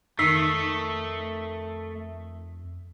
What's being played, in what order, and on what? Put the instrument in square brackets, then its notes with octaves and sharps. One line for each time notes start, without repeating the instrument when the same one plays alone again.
[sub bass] F2 [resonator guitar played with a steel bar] D#3 D#4 [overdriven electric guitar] A3 [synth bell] E6 B6 C7